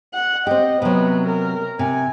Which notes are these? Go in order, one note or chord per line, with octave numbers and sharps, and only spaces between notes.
F#5
C4 G4 D#5
C3 F#3 B3
A#4
C3 G#5